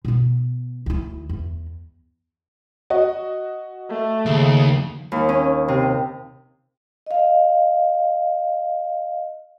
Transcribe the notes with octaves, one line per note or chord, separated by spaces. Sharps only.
B2 B3
D2 E4
E2
F#4 D#5
A3
D#2 C#3
D#2
C#4
C3
D#5 F5